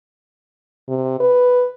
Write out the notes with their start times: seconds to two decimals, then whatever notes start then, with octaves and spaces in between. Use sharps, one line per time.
0.89 C3
1.20 B4